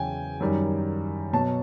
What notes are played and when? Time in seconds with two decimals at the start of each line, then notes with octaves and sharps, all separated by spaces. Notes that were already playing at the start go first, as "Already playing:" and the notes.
Already playing: E2 C#3 F#3 G5 G#5
0.40 F#2 D#3 G3
1.33 B2 F#3 A5